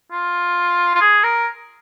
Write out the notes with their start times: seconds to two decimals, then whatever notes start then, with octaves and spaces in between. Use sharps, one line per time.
0.11 F4
0.95 F4
1.01 G#4
1.24 A#4